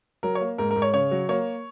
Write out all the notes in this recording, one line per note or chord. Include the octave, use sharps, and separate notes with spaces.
F#3 A#4
C#5
A#3
G#2 A#4
A#4
G#2
C#5
C#3 C#5
F#3
A#3 C#5